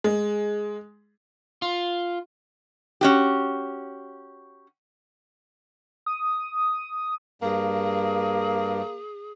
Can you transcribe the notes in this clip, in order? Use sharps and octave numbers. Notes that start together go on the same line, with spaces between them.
G#3
F4
C#4 F#4 G4
D#6
G2 A#3 G#4